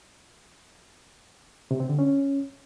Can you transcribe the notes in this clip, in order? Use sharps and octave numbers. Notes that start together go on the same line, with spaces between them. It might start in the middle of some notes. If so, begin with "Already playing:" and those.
C3
C4
D3
C#4